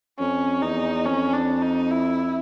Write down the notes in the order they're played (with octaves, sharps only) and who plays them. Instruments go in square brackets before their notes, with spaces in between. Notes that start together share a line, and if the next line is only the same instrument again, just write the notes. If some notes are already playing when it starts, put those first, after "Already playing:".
[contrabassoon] F2 [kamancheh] C#4
[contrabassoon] E2 [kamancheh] D#4
[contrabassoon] F2 [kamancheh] C#4
[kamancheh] D4
D#4
E4